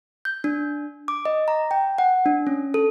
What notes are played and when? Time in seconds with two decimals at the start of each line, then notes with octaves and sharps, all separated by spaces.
0.25 G6
0.44 D4
1.08 D6
1.25 D#5
1.48 A#5
1.71 G5
1.98 F#5
2.26 D4
2.47 C#4
2.74 A4